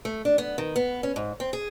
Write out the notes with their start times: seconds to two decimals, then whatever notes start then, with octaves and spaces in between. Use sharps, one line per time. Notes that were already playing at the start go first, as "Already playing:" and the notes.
0.05 A3
0.25 D4
0.38 B3
0.58 D#3
0.76 B3
1.03 C#4
1.16 G#2
1.40 C4
1.53 G#4